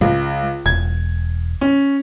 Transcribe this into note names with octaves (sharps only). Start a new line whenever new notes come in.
C#2 G#3
E1 G#6
C#4